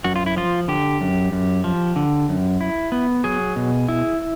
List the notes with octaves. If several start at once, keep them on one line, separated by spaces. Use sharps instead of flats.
F#2 F#4
F4
E4
F3 F4
D3 G4
F#2
F#2
F3
D3
F#2
E4
B3
F#3 G#4
B2
E4